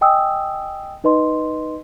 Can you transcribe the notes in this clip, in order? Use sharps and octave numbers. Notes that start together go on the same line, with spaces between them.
D#5 G5 G#5 D#6 E6
D#4 B4 D#5 C6